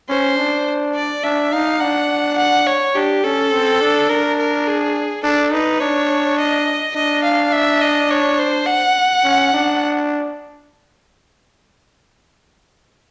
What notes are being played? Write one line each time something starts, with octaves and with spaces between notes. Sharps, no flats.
C#4 C5
D4
D5
D4 E5
D#4 F5
D4 F#5
F#5
C#5
D4 G4
C#4 A4
C4
D4
D4 A#4
A#4
G#4
D4 A4
D#4 B4
D4 C#5
D#5
D4 D#5
F5
E5
D#5
C#5
C5
F#5
C#4
D4